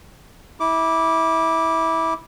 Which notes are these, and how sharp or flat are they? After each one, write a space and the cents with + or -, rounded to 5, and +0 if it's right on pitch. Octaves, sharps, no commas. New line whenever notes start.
E4 -20 D6 +0